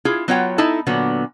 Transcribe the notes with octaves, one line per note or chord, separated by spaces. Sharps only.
E4 F4 G#4
F#3 B3 F4 C#5 F#5 G5
D#4 E4 A4
A#2 D3 F#3 B3